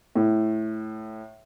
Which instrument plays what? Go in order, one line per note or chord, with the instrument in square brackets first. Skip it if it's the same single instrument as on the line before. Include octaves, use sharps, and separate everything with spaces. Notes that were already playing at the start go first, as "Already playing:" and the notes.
[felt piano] A2